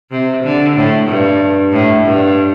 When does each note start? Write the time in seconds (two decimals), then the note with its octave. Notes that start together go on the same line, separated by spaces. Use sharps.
0.11 C3
0.43 D3
0.76 A2
1.08 G2
1.73 A2
2.05 G2